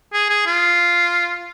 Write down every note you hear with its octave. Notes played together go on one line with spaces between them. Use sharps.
G#4
G#4
F4